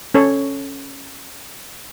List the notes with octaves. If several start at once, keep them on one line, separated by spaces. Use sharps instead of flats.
C#4 A4 C#5